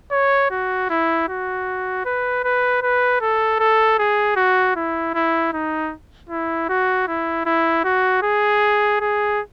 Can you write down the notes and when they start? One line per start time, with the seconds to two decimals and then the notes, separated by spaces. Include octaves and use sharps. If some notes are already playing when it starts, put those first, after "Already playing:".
0.11 C#5
0.50 F#4
0.90 E4
1.28 F#4
2.05 B4
2.44 B4
2.82 B4
3.21 A4
3.59 A4
3.99 G#4
4.36 F#4
4.75 E4
5.14 E4
5.53 D#4
6.29 E4
6.69 F#4
7.07 E4
7.45 E4
7.84 F#4
8.22 G#4
9.00 G#4